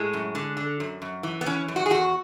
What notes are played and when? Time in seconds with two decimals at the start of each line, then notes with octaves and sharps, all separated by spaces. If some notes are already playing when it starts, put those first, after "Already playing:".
Already playing: A2 G#3
0.13 F#2
0.35 D3
0.57 D3
0.80 F#2
1.02 F#2
1.23 E3
1.41 B3
1.46 E3 C#4
1.68 F#2
1.76 F#4
1.86 G#4
1.90 E2 F#4